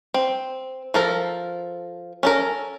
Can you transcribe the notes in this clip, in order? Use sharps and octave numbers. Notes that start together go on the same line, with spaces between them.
C4
F3 A4 A#4
C#4 A4 A#4